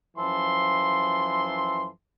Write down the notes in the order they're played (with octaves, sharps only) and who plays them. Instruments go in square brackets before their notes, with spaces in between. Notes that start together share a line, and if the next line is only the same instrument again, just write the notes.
[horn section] F#2 E3 F3 A4 C6